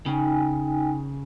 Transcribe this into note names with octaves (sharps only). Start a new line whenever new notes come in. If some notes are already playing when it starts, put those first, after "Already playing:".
C#3 D#4 G5 G#5